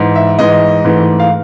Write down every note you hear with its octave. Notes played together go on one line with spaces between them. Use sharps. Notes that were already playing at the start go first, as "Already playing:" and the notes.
Already playing: G#2 E3 G#3
E5
G#2 E3 G#3 D#5
G#2 E3 A3
F5